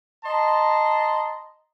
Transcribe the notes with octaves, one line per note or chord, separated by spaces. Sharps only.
D#5 A5 A#5 C6